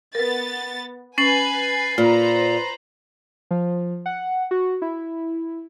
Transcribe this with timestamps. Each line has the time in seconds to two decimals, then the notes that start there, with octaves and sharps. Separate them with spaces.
0.15 B3 A#4 B4 A6
1.18 C#4 B4 G#5 A6 C7 F#7
1.98 A#2 F4 B4 C5 A#5
3.51 F3
4.06 F#5
4.51 F#4
4.82 E4